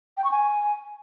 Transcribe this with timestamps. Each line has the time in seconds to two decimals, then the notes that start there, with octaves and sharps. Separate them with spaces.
0.17 G5
0.24 C#6
0.31 G#5